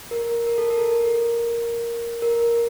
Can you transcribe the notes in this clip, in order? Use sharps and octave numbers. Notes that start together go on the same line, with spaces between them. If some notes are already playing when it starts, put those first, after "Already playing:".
A#4
A#4
A4
A#4
A#4